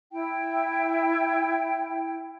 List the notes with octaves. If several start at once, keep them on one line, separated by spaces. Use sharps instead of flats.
E4 G5